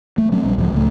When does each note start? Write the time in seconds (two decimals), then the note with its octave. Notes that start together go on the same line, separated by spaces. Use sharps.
0.18 A3
0.32 F#3 C4 C#4
0.44 A#1 G3 D4
0.58 C#2 A2 F3 G#3
0.72 C#2 A3